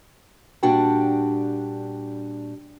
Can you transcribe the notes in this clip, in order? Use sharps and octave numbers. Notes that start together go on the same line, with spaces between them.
A#2 G3 D4 F#4 G5 A5